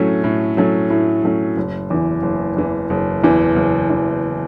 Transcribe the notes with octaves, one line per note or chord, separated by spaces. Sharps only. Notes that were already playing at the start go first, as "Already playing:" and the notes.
Already playing: A2 F#3 A3 C#4
A2
F#3 A3 C#4
A2
F#3 A3 C#4
F#1
E2 E3
F#1
E2 E3
F#1
E2 E3
F#1
E2 E3